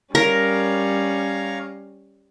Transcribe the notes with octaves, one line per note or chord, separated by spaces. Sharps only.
G3 C#4 A#4 C#5 F5 A#5